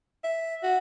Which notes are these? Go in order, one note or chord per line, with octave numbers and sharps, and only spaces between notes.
E5
F#4